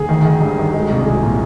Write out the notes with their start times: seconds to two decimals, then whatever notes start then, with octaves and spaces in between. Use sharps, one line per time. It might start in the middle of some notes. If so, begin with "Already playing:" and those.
Already playing: D2 G#4
0.09 D#3
0.25 D#3
0.41 G2
0.58 D#3
0.74 G#3
0.90 C2
1.06 G#3
1.23 A#2